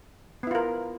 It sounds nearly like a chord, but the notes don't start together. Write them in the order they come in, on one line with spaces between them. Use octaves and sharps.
B3 E4 F4 A#4